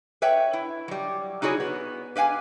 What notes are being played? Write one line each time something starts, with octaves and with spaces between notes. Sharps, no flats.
B4 C#5 E5 F#5 G5
E4
F#3 G3
D#4 E4 F#4 G#4 C#5
B3
G4 B4 F5 G5 G#5